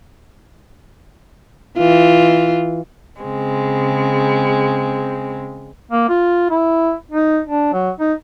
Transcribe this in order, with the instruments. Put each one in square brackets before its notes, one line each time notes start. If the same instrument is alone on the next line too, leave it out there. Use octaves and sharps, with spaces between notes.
[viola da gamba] E3 F4
[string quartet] C#3 G#3 C4
[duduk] A#3
F4
E4
D#4
D4
F#3
D#4